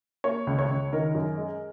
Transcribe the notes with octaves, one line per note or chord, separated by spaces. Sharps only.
A#3 C#5
C#2
C#5
C#2
D#3 A#4
F#2
G#3